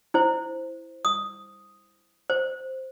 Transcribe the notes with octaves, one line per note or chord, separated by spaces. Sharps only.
E4 C5
D#6
C5